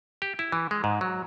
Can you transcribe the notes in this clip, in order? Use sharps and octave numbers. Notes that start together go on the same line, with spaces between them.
G4
E4
E3
G#3
G#2
F#3